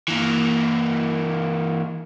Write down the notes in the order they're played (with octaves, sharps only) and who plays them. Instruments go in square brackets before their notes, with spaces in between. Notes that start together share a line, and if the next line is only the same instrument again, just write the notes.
[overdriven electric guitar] E3 A#3